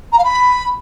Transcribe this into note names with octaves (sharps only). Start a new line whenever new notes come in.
A#5
F5
B5